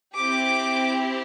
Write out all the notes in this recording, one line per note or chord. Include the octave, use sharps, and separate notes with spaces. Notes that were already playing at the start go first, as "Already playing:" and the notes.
C4 E4 G4 D6